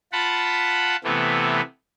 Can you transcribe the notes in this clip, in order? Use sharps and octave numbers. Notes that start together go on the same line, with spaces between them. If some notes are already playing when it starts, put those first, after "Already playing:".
F4 F#5 A5 B5
C3 E3 A3 B3